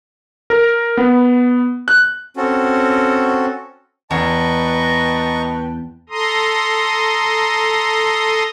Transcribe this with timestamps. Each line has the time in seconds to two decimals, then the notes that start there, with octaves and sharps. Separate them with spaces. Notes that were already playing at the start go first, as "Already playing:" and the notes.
0.50 A#4
0.97 B3
1.88 F#6
2.37 C4 C#4 F#4 A4
4.11 E2 B4 D#5 G5 A5 A#5 C#6
6.09 A4 A#5 C6 D#6